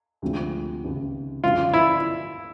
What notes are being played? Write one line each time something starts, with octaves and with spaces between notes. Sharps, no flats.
D2 C3 F3 G#3 C4
C#2 C3 D#3
F#2 D3 F3 G#3 F4
E4